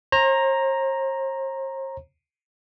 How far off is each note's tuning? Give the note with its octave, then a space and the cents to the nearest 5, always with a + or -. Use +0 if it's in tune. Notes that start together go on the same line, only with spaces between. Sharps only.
C5 +45 A#5 +0